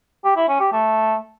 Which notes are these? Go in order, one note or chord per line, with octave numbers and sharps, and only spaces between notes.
G4
E4
C#4
G4
A3